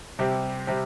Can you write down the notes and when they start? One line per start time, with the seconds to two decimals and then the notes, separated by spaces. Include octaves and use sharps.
0.19 C3 G3 C4 G4
0.67 C3 G3 C4 G4